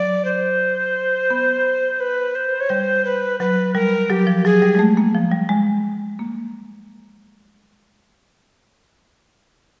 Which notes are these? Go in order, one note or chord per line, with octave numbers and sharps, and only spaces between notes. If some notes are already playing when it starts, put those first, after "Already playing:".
Already playing: F#3 D5
C5
B3
B4
C5
C#5
G3 C5
B4
F#3 B4
G3 A#4
F#3 G4
F3
F#3 G#4
G3
G#3
A3
A#3
F3
G3
G#3
A#3